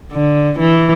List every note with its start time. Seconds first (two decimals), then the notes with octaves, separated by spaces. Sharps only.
0.12 D3
0.59 E3